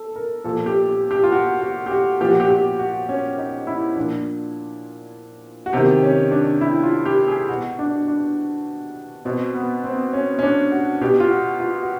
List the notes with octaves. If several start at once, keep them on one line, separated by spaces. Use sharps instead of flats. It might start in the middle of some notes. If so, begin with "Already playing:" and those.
Already playing: A4
A#4
A#2 F3 A4
G4
G4
G4
F4
F#4
F#4
G4
F#4
A#2 F3 G4
F#4
G4
G4
F#4
C#4
D#4
E4
A#2 F3 D4
F#4
C3 D#3 G4
C#4
D4
E4
F4
G4
G#4
B2 F#4
D4
D4
B2 C4
B3
C4
C#4
C#4
D4
F#4
B2 G4
F4
F#4
F4
F#4